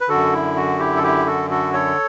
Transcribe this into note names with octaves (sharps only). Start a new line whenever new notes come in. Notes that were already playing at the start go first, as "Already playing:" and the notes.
B4
F#2 D3 F#4 A4
E4
F#4
E4 G4
A4
E4 G4
F#4 A4
F#4 A4
A4 C#5